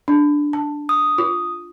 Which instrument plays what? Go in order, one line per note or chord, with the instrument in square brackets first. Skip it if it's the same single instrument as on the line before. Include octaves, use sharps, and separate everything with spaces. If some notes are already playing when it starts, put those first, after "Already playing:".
[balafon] D4
A5
[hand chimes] D#6
[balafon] F4